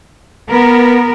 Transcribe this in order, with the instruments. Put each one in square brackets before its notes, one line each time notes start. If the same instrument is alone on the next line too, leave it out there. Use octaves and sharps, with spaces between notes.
[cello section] B3 A#4